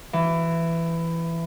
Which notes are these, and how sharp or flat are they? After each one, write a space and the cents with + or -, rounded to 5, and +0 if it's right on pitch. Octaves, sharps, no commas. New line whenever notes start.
E3 +15